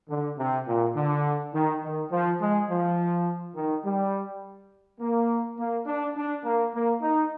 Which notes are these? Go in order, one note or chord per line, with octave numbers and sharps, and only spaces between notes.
D3
C3
A#2
D3
D#3
D#3
F3
G#3
F3
D#3
G3
A#3
A#3
D4
D4
A#3
A#3
D#4